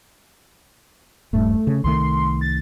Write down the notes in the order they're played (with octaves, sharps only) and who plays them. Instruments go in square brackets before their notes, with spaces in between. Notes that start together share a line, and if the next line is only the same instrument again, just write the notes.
[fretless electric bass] D#1 G2 [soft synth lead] A3
[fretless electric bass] C#3
[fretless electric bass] C2 D#3 A3 [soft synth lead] C6
[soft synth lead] A6